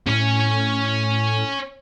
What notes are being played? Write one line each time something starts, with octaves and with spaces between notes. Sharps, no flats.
A2 C#4 C#5